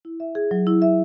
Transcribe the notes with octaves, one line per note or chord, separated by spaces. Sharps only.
E4
E5
G#4
F#3
E4
E5